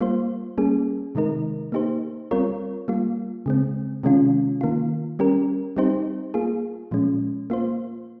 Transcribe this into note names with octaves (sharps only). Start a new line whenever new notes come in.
G3 A#3 F4 C5
G3 A#3 C#4 G#4
C3 D#3 G#3 D#4 A#4
A#3 D#4 G4 C5
G3 C4 F4 A#4 C#5
G3 A#3 F4
C#3 G#3 C4
C3 D#3 G#3 C#4 F4
D#3 A#3 F4
G3 C#4 G4 A#4
G3 C4 D#4 G4 C5
A#3 F4 G#4
A#2 F3 G#3 C#4
A#3 F4 C5